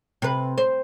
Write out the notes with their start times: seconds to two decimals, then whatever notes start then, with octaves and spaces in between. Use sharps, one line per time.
0.22 C3 B4
0.58 C5